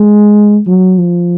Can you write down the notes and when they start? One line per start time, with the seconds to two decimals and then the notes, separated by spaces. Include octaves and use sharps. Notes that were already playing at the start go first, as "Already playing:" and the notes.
Already playing: G#3
0.67 F#3
0.98 F3